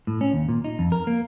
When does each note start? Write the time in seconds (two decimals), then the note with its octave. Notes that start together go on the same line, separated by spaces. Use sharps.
0.07 A2
0.21 C#4
0.33 D#2
0.49 A#2
0.64 D#4
0.79 F2
0.92 A#4
1.07 A#3